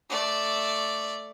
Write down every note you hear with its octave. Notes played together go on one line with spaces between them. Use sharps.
A3 D5